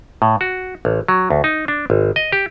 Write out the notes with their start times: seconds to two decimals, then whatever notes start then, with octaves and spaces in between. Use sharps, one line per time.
0.22 A2
0.41 F#4
0.85 A1
1.08 F#3
1.30 D2
1.44 D#4
1.68 D4
1.90 G#1
2.16 D#5
2.32 G4